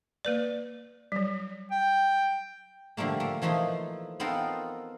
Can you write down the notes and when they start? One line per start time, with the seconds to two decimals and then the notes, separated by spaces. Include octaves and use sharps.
0.25 A#3 B4 D5
1.12 F#3 G3
1.71 G5
2.97 D3 F3 G3 A3 A#3
3.20 A3 A#3
3.42 E3 F3 A3 D#4 C5
4.20 B3 C4 D#4 F4 A4 A#4